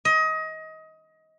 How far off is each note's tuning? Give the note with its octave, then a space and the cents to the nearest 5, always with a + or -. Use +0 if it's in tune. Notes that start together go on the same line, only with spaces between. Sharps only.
D#5 +25